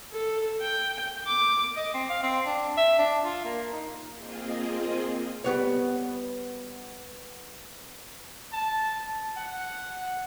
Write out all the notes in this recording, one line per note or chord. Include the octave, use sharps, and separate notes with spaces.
A4
G5
D6
D#5
C4
F5
C4
D4
E5
D4
F4
A#3
D#4
A#3 C4 F4 G#4 D#5
G3 B3 C#5
A5
F#5